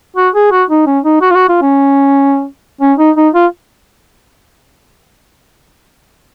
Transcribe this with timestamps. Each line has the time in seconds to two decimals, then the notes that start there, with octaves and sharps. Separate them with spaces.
0.16 F#4
0.35 G#4
0.51 F#4
0.70 D#4
0.87 C#4
1.04 D#4
1.22 F#4
1.31 F4
1.35 F#4
1.49 F4
1.62 C#4
2.81 C#4
2.98 D#4
3.16 D#4
3.34 F4